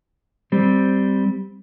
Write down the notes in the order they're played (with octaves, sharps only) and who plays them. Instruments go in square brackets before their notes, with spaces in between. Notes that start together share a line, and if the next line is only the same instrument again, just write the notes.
[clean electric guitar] G3 C4